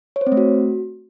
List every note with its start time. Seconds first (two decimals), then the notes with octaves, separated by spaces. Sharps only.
0.16 C#5
0.21 C5
0.27 C4
0.32 A3
0.37 F#4